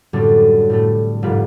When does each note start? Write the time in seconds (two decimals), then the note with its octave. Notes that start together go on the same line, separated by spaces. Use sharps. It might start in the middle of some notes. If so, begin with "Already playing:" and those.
0.13 F#2 A2 D3 G3 C4 D4
0.70 A2 G3 A3
1.22 F1 G#2 G3 F4 B4